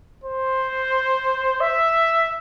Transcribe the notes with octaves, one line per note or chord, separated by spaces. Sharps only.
C5
E5